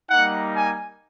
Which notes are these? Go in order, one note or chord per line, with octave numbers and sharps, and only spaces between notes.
G3 A#3 D#4 F#5
G#5